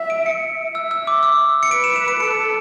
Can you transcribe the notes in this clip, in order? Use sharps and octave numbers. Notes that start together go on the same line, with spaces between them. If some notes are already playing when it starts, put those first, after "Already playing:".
Already playing: E5
D7
C#7
E5 E6
E6
D6
E6
C#7
B4 D7
E7
E7
D7
A4 C#7